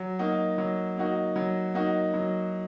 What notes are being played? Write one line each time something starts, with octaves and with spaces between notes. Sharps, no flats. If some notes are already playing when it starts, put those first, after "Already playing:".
Already playing: F#3
A#3 D#4 F#4
F#3
A#3 D#4 F#4
F#3
A#3 D#4 F#4
F#3